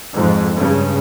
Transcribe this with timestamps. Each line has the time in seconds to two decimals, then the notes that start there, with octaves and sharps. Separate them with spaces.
0.15 F2 G#2
0.55 G2 C#3